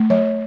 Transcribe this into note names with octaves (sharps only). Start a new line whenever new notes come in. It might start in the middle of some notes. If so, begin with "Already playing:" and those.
Already playing: A3
F#3 C#5